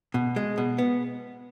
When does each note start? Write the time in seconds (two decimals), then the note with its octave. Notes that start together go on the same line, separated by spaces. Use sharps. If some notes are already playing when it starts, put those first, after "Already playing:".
0.14 B2
0.36 G#3
0.58 B2
0.78 B3